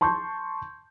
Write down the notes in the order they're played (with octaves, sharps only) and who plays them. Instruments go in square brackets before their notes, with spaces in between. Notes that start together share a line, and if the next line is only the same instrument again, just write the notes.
[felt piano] A5 C6 C#6 G6